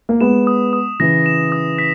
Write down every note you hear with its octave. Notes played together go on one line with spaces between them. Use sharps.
A#3
G#3 B3 E7
D#6
D#6
C#3 E3 A#6
E7
D#6
B6